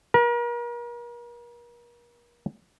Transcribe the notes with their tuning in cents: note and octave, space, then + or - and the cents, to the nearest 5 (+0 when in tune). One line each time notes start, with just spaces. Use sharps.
A#4 +40